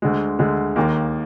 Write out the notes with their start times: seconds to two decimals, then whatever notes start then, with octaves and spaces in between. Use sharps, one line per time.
0.02 D2 D3 G#3
0.39 D2 D3 G#3
0.76 D#2 D#3 A#3